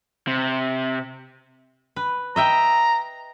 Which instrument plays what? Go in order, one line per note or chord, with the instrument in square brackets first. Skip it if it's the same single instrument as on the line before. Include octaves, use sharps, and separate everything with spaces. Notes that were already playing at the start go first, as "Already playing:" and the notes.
[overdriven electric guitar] C3
[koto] B4
[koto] D#5 E5 G5 [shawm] A#5